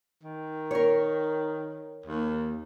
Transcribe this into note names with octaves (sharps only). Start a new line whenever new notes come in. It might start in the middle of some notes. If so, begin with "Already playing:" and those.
D#3
A#4 C#5
D#2